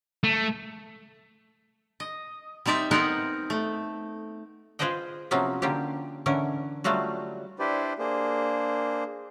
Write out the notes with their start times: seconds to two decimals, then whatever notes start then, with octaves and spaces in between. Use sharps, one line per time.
0.24 A3
2.00 D#5
2.66 G3 C4 D#4 D5 E5
2.91 B3 C4 D#4 A#4 F#5
3.50 A3
4.79 F4 G#4 B4 C5 D#5 G5
5.31 C3 F3 F#3 A#3 B3 C#4
5.62 D3 A#3 C#4 F4 G4
6.26 D3 E3 C#4 A#4
6.84 F#3 G3 A3 F4 F#4
7.59 D4 E4 G4 B4 C5 D5
7.99 A#3 D4 G#4 C5